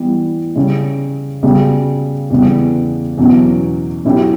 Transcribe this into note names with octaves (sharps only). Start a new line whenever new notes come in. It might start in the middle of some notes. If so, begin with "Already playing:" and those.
Already playing: E3 G3 B3
C#3 G3 C#4
C#3 G3 B3 F#4
E2 C#3 G3 B3
E2 B2 F#3 C#4
B2 F#3 C#4 E4 G4